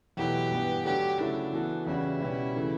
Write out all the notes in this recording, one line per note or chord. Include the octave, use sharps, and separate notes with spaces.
E2 B2 F#3 A3 E4 G4
G2 E3 B3
D3 F#3 A3 G4
C#3 F#3 A3 D4 E4
E3 B3 F#4 A4
E2 C#3 G3 C#4 E4 F#4
B2 G3 C#4
C#3 E3 A3